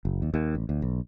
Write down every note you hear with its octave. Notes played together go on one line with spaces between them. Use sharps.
F#1
D#2
D#2
A1
D2
B1